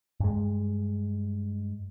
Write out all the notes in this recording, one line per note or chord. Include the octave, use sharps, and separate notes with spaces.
G2 G#3